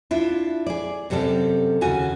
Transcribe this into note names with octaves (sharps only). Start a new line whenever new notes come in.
D4 E4 F4
G#4 D5
F#2 C3 G3 A4 D5
D#2 C#3 F#4 G#5